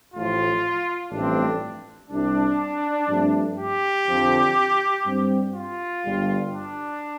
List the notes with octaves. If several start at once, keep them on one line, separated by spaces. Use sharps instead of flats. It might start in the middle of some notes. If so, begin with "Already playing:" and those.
A1 A2 F3 F4
A1 G2 F3 A3 C4 D4
C2 C3 G3 D4
G2 F3 A3 C4
G4
F2 D3 F3 C4
G2 G3 C4
F4
G1 G2 G3
D4